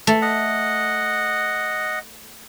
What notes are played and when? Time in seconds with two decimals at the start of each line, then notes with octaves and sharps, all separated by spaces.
0.07 A3
0.22 D#5 F#5